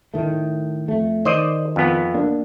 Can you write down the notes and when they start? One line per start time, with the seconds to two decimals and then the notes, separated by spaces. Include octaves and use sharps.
0.14 A2 D#3 A3
0.88 F2 A3
1.25 D#3 C5 D5 D#5
1.76 F2 B3
2.14 A#3 D4